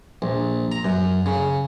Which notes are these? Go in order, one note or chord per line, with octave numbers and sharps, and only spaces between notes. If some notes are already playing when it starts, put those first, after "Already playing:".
A#1
A#5
F#2
C#3